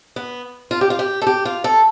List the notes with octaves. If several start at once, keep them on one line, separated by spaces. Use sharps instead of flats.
B3
F4
G4
F4
G4
A4
G4
F4
A4